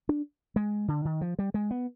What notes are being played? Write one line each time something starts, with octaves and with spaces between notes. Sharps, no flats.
D4
G#3
D3
D#3
F3
G3
G#3
B3